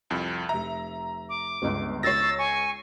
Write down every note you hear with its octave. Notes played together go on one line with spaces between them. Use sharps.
C2 F2
F1 E5 A#5
D6
G1 C#2
C#2 C#5 E6 A6 A#6 C7
G#5 C#6